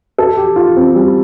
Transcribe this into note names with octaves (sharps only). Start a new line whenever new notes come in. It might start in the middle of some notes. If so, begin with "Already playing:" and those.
A4
G4
F4
C4
G3